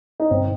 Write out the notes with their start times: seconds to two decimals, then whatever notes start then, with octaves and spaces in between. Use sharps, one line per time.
0.20 D#4
0.30 G1 C4